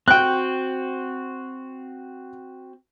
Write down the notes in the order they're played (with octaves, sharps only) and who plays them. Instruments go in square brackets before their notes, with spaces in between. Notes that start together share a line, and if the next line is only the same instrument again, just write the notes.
[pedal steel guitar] C4 F#4 [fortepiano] G5 F#6